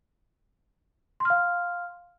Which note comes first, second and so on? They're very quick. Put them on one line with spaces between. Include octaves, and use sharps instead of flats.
C6 F6 F5